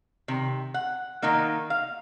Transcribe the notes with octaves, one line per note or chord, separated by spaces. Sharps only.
C3 D#3
F#5
D#3 A#3 D#4
F5